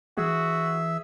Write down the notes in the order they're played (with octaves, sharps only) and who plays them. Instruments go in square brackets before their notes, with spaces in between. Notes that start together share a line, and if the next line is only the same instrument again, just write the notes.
[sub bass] E3 [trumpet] F#4 [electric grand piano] G#4 [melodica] E5